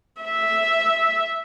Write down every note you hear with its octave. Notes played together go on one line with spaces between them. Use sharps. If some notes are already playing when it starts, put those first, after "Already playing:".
E5